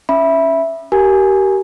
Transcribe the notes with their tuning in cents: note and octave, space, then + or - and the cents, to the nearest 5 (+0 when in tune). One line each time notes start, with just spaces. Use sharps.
C#4 +0 E5 +0 B5 -15
G4 -25 A#4 +0 G#5 +0